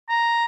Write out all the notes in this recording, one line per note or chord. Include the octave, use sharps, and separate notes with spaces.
A#5